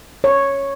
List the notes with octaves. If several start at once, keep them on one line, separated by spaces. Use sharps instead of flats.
C#5